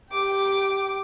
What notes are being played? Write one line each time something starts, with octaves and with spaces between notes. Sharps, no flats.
G4 G5 D6